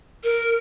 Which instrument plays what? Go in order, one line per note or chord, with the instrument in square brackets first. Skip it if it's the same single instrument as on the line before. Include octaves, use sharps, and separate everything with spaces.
[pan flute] A#4